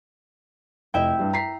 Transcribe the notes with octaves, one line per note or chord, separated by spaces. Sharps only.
F1 E4 D#5 E5 G5
G2 G3
A#5 B6 C7